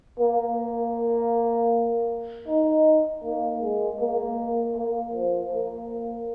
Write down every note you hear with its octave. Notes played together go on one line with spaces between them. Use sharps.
A#3
D#4
A#3
G#3
A#3
A#3
F3
A#3